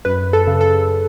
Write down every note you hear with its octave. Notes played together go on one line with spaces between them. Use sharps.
F#2 B4
A4
C#3
A4